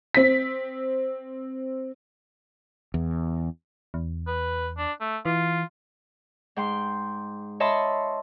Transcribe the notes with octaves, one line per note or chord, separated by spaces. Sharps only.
C4 B6
E2
E2
B4
D4
A3
E3 F4
G#2 G5 C6
C#5 D#5 E5 A5 B5 C6